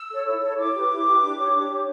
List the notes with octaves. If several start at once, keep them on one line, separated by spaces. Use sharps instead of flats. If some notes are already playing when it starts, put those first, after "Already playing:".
Already playing: E6
A4 C#5
E4
A4 C#5
E4 D6
G4 B4
E4
G4 B4
D4
G4 C#5
D4
G4 C#5